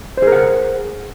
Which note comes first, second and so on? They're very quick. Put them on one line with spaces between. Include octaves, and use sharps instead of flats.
C5 G#4 A#4 F#5